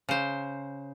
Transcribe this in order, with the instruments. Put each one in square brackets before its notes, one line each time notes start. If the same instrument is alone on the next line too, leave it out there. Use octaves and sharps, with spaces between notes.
[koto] C#3 C5